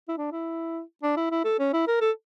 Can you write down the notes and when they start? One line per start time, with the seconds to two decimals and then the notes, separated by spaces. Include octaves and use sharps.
0.08 E4
0.17 D4
0.32 E4
1.03 D4
1.17 E4
1.31 E4
1.44 A4
1.59 C#4
1.73 E4
1.87 A#4
2.01 A4